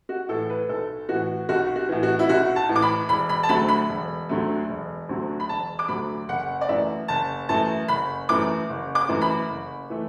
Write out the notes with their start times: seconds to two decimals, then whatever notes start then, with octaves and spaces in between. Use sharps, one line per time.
0.09 F#4
0.29 A2 E3 A4
0.50 B4
0.69 B1 A4
1.09 A2 E3 F#4
1.49 B1 F#4
1.76 F#4
1.89 A2 E3
2.03 F#4
2.19 E4
2.29 B1 F#4
2.56 A5
2.69 A2 E3
2.76 D6
2.82 B5
3.09 E1 B5
3.29 B5
3.43 A5
3.49 D2 D3 F#3 A3 B5
3.68 B5
3.89 E1
4.29 D2 D3 F#3 A3
4.69 E1
5.09 D2 D3 F#3 A3
5.40 B5
5.49 E1 A5
5.79 D6
5.88 D2 D3 F#3 A3 B5
6.28 F#1 F#5
6.61 D5
6.69 F#2 E3 A3 E5
7.08 F#1 A5
7.49 F#2 E3 A3 A5
7.88 F#1 B5
8.29 F#2 E3 A3 D6
8.69 F#1
8.95 D6
9.08 F#2 E3 A3
9.22 B5
9.49 F#1
9.90 E3 A3